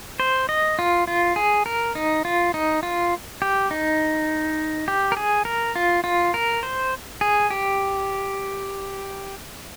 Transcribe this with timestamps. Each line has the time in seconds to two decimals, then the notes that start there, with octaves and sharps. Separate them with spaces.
0.20 C5
0.49 D#5
0.79 F4
1.07 F4
1.36 G#4
1.66 A#4
1.95 D#4
2.25 F4
2.54 D#4
2.83 F4
3.42 G4
3.71 D#4
4.88 G4
5.12 A#4
5.17 G#4
5.45 A#4
5.76 F4
6.04 F4
6.34 A#4
6.63 C5
7.21 G#4
7.50 G4